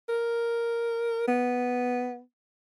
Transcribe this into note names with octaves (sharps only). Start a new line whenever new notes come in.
A#4
B3